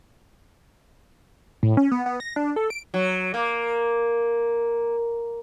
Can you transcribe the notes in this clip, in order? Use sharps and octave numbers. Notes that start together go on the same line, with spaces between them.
A2
C#4
B3
B3
A#6
D4
A4
D7
F#3
A#3